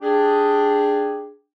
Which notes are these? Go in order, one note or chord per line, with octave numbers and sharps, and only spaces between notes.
D4 G4 G#4